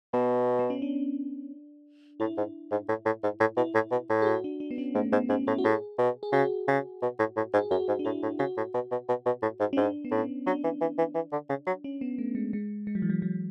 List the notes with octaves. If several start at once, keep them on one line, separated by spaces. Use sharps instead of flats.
B2 B3
B3
C#4
D4
A2 E4
G#2
G#2
A2
A2
G#2
A2
B2 E4
A2
B2
A2
G#4
F#4
D4
D4
B3
C#4
G#2 A3
G#2 B3
G#2 C#4
A2 E4
F#4
A2 G#4
B2
G#4
C#3 F#4
C#3
B2
A2
A2
G#2
G#4
F#2 F#4
G#2
D4
A2 E4
A2
C#3 F#4
A2
B2
B2
B2
B2
A2
G#2
C#4
G#2 D4
B3
A2 C#4
F#3 D4
E3
E3
E3
E3
D3
C#3
F#3
C#4
B3
A3
G#3
G#3
G#3
F#3
E3
F#3
F#3